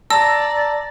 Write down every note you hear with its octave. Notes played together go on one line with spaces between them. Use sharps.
D5 A5 A#5 E6 A#6